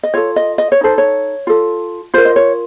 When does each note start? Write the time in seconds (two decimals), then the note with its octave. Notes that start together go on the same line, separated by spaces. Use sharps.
0.03 D#5
0.14 F4 A4 C#5
0.36 D#5
0.58 D#5
0.72 C#5
0.81 D#4 A4 C5
0.98 C#5
1.47 F4 A4
2.14 F4 A#4 C5
2.25 D#5
2.36 C#5